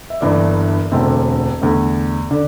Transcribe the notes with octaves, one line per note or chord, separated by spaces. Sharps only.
E5
G1 G2 E3 A#3 D5
E1 D2 D3 A3 C4
E2 D3 A3
D3 D5